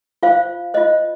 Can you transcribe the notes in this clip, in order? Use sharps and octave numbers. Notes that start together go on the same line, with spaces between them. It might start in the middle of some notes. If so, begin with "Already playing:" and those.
F4 C5 F5
F4 C5 D#5